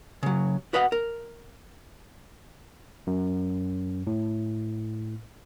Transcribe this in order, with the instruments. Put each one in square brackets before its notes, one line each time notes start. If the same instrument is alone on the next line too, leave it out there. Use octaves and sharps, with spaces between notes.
[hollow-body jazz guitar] C#3 F#3
F#4 B4 D#5 F5 F#5
A#4
[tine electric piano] F#2
A2